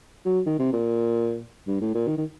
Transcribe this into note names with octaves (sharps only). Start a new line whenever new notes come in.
F#3
D#3
C3
A#2
G2
A2
A#2
D#3
D#3